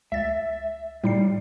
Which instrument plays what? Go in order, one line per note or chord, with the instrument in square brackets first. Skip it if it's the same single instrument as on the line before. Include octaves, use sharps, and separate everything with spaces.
[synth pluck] C#2 A6 [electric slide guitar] E5
[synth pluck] A2 D#4 C7 [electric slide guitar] G3